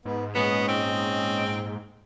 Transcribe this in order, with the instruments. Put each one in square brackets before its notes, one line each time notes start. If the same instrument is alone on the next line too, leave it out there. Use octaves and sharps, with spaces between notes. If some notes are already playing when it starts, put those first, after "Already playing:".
[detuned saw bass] G#2 [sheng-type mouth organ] B3
[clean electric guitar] A#2 G#3 [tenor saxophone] B3 [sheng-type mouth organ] C#4 D#5
[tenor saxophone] C4